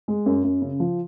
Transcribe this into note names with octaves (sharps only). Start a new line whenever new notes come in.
G#3
F#2
F#2
C#3
F3